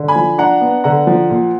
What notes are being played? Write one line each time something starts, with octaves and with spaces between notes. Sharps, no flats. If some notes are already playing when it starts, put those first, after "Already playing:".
Already playing: D3
G#5 B5
F3
D4 F#5 A#5
B3
D3 F#5 A#5
F3
A#2